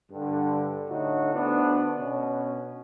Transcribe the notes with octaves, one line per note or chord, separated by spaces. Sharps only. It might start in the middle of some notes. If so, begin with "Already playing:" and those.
G2 D3
A2 D3 D#4 F#4
D2 B3 D4
B2 C#4